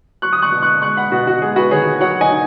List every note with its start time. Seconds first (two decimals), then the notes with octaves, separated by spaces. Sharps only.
0.22 F#3 C#6 F#6
0.33 D#6
0.42 C#6 F#6
0.52 B2
0.63 C#6 F#6
0.82 G#3 C#6 F#6
0.97 F#5 B5
1.12 B2 F#4 B4
1.27 F#4
1.42 G#3 G#4
1.56 F#4 B4
1.71 D#3 G#4 C#5
2.00 F#3 C#5 F#5
2.21 D#5 G#5
2.31 D#4